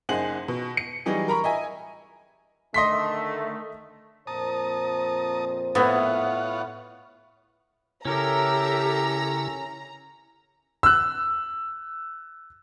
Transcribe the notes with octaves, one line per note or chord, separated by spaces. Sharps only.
F#1 D#4 G#4 C5 F#5 F#7
B2
C#7
E3 F#3 G3 D#4 G#4
A#4 A#5 B5 C#6
D#5 E5 G#5
D3 D#3 A3 D#5 C6 B6
F2 A#2 C5 A5 A#5 D#6
A2 B3 F4 C#5 F#5
C#3 C#4 E4 G4 A4 A#4 E5 A#5
E6 F#6